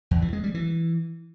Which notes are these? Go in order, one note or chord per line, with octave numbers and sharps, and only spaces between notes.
E2
E3
G#3
G3
E3